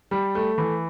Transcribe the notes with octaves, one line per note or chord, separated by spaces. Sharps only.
G3
A3
E3